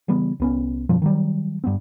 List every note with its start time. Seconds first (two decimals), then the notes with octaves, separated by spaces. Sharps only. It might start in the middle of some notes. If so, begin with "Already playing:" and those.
0.08 C#3 E3 G3 B3
0.40 C2 B3 C#4
0.89 F#2 B2 F3 G3
1.02 D#3 F#3 G3
1.64 G2 B3 C4